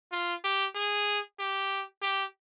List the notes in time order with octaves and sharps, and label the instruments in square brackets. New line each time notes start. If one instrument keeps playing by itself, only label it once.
[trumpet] F4
G4
G#4
G4
G4